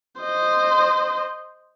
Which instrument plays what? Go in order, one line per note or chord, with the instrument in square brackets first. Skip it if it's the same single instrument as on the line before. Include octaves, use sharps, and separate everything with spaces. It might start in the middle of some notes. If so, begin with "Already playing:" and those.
[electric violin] C5 D#5